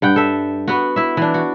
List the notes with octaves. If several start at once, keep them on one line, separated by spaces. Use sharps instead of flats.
G2 F#5 G5
A4 E5
B3 F#4
E4 E5
E3 D4
F#4